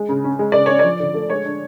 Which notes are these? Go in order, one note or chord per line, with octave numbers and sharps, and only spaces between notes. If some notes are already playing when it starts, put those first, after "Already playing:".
Already playing: G#3
C#3
C#4
G#3
C#3 D5
C#4 C#5
F3 D5
D3
A3
G#3 C#5
D4